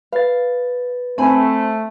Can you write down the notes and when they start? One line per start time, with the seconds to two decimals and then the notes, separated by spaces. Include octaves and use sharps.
0.12 B4 F5 A6
1.18 A3 C4 G#5 A5 B5